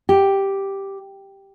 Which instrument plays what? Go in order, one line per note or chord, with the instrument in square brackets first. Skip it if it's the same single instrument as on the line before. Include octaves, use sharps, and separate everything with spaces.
[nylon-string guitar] G4